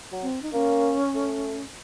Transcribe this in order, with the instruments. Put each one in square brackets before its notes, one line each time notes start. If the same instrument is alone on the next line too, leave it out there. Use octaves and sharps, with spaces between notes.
[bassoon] F#3
[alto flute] C4
D#4
[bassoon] A#3 [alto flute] C#4
[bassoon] A3